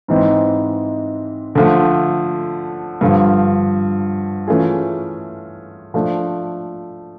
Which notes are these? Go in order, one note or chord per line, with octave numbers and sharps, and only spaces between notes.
G#2 E3 G#3 C4
D3 F3 A3
G2 D3 F3
E3 A3 C#4 F4 G#4
F3 A3 D4